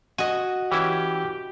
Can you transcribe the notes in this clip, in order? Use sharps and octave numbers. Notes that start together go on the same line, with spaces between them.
F#4 D#5 G#5
E3 C#4 E4 G4